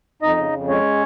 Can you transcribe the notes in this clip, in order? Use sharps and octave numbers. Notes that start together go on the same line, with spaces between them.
F2 D#4 D#5
C#3
F2
G#3 C#4 C#5